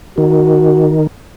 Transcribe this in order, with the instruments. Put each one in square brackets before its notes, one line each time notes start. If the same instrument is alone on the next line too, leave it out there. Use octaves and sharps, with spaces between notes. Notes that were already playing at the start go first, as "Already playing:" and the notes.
[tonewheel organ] D#3 [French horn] F#4